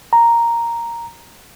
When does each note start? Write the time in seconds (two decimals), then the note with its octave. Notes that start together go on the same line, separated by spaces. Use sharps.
0.13 A#5